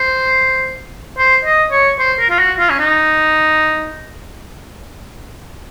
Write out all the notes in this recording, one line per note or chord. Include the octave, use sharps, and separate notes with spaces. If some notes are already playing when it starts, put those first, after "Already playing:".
Already playing: C5
C5
D#5
C#5
C5
A#4
F4
F#4
F4
C#4
D#4